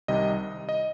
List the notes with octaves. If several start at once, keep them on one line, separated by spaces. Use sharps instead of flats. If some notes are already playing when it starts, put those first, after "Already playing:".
C2 C3 D#3 G3 D#5
D#5